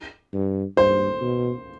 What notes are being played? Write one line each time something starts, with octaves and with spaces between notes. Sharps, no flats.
G2
G2 C5
B2